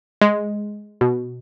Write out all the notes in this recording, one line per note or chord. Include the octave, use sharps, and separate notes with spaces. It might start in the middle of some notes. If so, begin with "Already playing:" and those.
G#3
B2